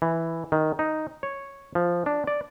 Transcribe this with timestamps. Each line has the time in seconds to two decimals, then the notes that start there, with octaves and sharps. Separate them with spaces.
0.02 E3
0.52 D#3
0.79 D#4
1.23 C#5
1.75 F3
2.06 D4
2.27 D5